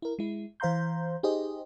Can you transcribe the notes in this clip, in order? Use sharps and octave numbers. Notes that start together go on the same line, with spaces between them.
E4 A#4
G#3 E4
E3 C5 F5 A#5 C6 G6
D#4 G4 G#4 C5 D#5